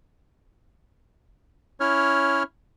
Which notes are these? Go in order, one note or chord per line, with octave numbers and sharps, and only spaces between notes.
C#4 E4 C#5 F6